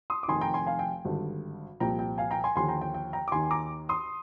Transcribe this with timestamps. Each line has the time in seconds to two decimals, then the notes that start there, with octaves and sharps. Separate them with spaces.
0.10 C6 D#6
0.23 D6
0.28 F1 F2 D#3 G#5 C6
0.41 G5 A#5
0.54 G#5 C6
0.67 F5 G#5
0.79 G5
1.05 G#1 G2 D3
1.80 C2 A#2 F3 G5 A#5
1.99 G5
2.18 F5 G#5
2.31 G5 A#5
2.44 G#5 C6
2.56 D#2 D3 F3 G#5 C6
2.69 G5 A#5
2.81 G5
2.94 G5
3.13 G5 A#5
3.28 D6
3.32 D#2 D#3 G#5 C6
3.51 A#5 D6
3.89 C6 D#6